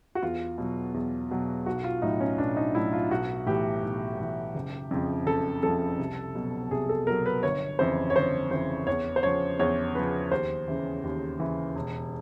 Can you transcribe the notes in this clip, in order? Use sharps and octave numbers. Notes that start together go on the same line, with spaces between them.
F#4
E2 F4
B2 F#3
E2
B2 F#3
B1 F#4
F4
A2 F#3 D#4
C#4
B1 D4
D#4
A2 F#3 E4
F4
B1 F#4
A2 E3 G4
B1
A2 E3
F#1
F2 C#3 F3
F#1 A4
F2 C#3 F3 A4
C2
B2 F#3
C2 G#4
A4
B2 F#3 A#4
B4
G1 C#5
F2 C#3 E3 C5
C#5
G1 C5
F2 C#3 E3 C5
E2 C#5
C5
C#3 F3 C#5
E2 C#5
C#3 F3 B4
D#2 C5
C#3 E3
D#2
C#3 E3
E1